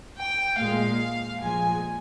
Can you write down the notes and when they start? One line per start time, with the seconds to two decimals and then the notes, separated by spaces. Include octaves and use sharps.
0.17 G5
0.57 A#2 G#3 F5
1.39 A#2 F3 G#3 G#5